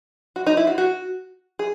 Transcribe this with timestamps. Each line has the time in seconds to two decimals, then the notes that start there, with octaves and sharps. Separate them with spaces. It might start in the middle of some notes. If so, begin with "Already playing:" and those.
0.36 F#4
0.47 D#4
0.57 E4
0.67 F#4
0.78 F#4
1.59 G#4